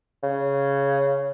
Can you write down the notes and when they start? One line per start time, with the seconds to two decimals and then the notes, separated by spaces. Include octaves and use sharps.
0.23 C#3